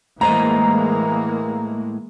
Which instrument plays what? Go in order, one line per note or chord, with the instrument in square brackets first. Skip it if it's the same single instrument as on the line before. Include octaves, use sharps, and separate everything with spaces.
[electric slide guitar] A2 C5 D#5 [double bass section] E3 G#3 A#3 [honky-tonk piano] A#5